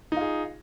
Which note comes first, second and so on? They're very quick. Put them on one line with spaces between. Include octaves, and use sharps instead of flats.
D#4 F4 G#4